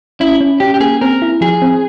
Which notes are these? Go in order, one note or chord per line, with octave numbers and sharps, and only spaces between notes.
C#4 E4
C#4
C#4 G4
G4
A#3 G#4
C4 A#4
E4
F3 G#4
C4